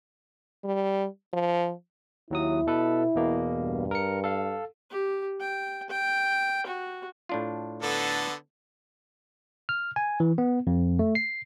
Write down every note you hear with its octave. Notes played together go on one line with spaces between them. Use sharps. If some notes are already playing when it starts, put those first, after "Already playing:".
G3
F3
D#2 F#3 E4 D#6
B2 A4 B4
E2 B2 A#3
G2
A#4 C#7
A4 F5
G4
G5
G5
F#4
A2 D4 F4
D3 B3 A4
F6
G#5
E3
B3
F2
A3
C7